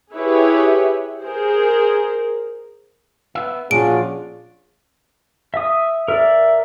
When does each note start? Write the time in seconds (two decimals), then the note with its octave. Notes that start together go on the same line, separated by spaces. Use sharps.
0.14 E4 G4 G#4 B4 C#5 E5
1.24 G#4 A#4 C5
3.35 B3 E5
3.71 A#2 F3 C#4 D4 F4 F#4 G#4 D7
5.54 E5 D#6
6.08 A#4 D5 E5